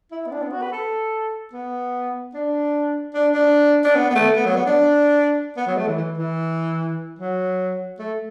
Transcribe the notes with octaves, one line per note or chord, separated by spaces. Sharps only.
E4
B3
D4
B3
F#4
B4
A4
B3
D4
D4
D4
D4
B3
B3
A3
B3
F#3
B3
D4
B3
F#3
A3
E3
E3
E3
F#3
A3